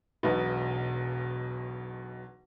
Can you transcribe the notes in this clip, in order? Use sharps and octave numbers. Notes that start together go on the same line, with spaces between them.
E1 B1 B2